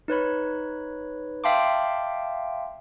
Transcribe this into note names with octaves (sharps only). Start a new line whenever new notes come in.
D#4 B4 C#5 B5
E5 F5 G5 A5 C6 D6